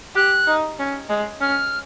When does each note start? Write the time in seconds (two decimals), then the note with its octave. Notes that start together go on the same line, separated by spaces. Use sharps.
0.15 G4 F#6
0.47 D#4
0.79 C#4
1.09 G#3
1.41 C#4 F6